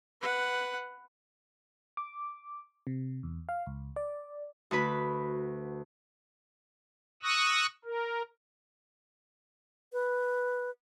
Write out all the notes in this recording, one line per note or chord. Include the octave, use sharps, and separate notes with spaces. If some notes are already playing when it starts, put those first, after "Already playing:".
B4 F#5
D6
C3
E2
F5
C#2
D5
D2 F#4 B4 B5
C#6 D#6 E6 F#6 A#6
A#4
B4